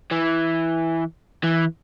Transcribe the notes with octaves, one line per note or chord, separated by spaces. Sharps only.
E3
E3